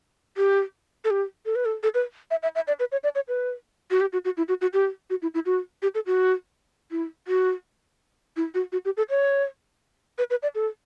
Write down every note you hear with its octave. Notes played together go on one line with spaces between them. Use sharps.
G4
A4
G4
A4
B4
A4
A4
B4
E5
E5
E5
D5
B4
C#5
D5
C#5
B4
F#4
G4
F#4
F#4
E4
F#4
F#4
G4
F#4
E4
E4
F#4
G4
A4
F#4
E4
F#4
E4
F#4
F#4
G4
A4
C#5
B4
B4
D5
A4